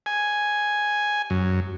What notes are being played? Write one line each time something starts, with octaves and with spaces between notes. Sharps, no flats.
G#5
F#2